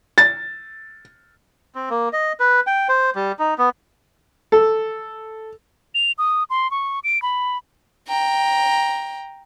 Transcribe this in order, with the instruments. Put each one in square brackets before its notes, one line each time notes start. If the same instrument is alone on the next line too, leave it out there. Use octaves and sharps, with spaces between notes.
[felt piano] A6
[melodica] C4
A#3
D#5
B4
G5
C5
G3
D#4
B3
[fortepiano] A4
[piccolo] F7
D#6
C6
C#6
D7
B5
[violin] G5 A#5